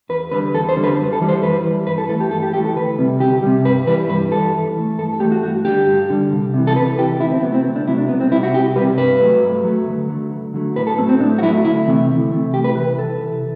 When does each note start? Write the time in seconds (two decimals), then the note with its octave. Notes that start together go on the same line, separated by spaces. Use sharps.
0.09 E2 B4
0.32 D3 G3 B4
0.54 E2 A4
0.69 C5
0.77 D3 G3
0.83 B4
0.98 F#2
1.13 A4
1.21 E3 G3
1.28 C5
1.43 F#2 B4
1.65 E3 G3
1.87 G2 B4
1.98 A4
2.09 E3 A3 A4
2.20 G4
2.31 G2 A4
2.43 G4
2.53 E3 A3 G4
2.65 A4
2.76 D2 B4
2.98 C3 G3
3.20 D2 G4
3.43 C3 G3
3.65 G2 B4
3.87 E3 G3 B4
4.09 G2 B4
4.31 E3 G3 A4
4.54 G2
4.76 E3 A3
4.98 G2 A4
5.13 A4
5.20 E3 A3 G4
5.32 F#4
5.42 G2 F#4
5.65 D3 G3 G4
5.87 G2
6.10 D3 G3
6.32 C2
6.54 C3 E3
6.67 A4
6.76 C2 B4
6.98 C3 E3 G4
7.20 D2 E4
7.31 C4
7.43 C3 F#3 A3 B3
7.54 C4
7.65 D2
7.76 D4
7.87 C3 F#3 A3 E4
7.98 D4
8.09 C2 B3
8.20 C4
8.32 C3 G3 E4
8.43 F#4
8.54 C2 G4
8.76 G3 B4
8.80 C3
8.98 G2 B4
9.21 F#3 A3
9.42 G2
9.64 F#3 A3
9.87 D2
10.09 D3 F#3 A3
10.31 D2
10.54 D3 F#3 A3
10.76 A2 B4
10.87 A4
10.98 F#3 C4
11.02 A3
11.09 C4
11.20 A2 D4
11.38 F#4
11.43 F#3 E4
11.46 A3
11.64 D2 E4
11.87 C3 E3 A3
12.09 D2
12.32 C3 E3 A3
12.54 C2 G4
12.64 B4
12.75 C3 E3 B4
12.87 B4
12.98 C2 A4
13.21 C3 E3